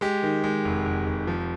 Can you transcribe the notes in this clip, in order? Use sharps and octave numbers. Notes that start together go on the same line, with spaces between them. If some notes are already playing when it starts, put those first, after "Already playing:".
G#3 G4
D#3
G#3
F1
F1
F1
F3